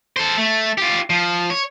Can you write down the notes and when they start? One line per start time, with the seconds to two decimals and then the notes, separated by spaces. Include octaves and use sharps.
0.16 A4 C5
0.37 A3
0.78 F4 G4
1.10 F3
1.50 C#5